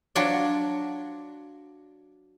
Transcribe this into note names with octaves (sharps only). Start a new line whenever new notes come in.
F#3 D4 F4 F#4 D5